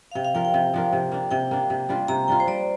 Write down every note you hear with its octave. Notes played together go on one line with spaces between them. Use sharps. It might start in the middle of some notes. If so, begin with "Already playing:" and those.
F5
C3 G5
F5
F3 D4 A#4 G5
G5
C3
F3 D4 A#4
C3
A#3 D4
C3 G5
A#3 D4
C3
G3 D4 F4
C3 A#5
G3 D4 F4 G5
C5
G3 D5